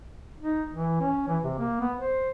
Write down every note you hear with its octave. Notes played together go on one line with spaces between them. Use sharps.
D#4
E3
C#4
E3
C3
A#3
B3
C5